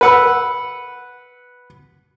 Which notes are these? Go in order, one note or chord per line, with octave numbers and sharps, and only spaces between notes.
B4 F#5 E6